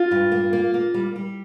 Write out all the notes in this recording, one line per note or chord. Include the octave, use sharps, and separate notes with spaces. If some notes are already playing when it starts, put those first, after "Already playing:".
Already playing: F4
G2
A#3
A#3
A#3
G3
G3